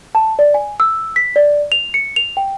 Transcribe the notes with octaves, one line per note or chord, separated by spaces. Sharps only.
A5
D5
G#5
E6
B6
D5
F7
C#7
F7
G5